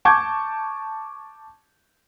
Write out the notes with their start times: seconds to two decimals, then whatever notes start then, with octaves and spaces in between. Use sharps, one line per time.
0.05 A5 C#6 D6 G6 G#6